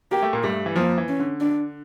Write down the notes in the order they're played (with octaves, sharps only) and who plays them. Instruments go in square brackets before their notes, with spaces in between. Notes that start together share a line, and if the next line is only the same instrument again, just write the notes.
[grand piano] A#3 [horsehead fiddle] G4
[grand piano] A3
A#2 A#3
[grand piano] G2 G3 [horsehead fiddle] A3
[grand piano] E3
[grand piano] F2 F3 [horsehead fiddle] A#3
[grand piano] E3
[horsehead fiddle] C#4
[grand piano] D3
[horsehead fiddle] D4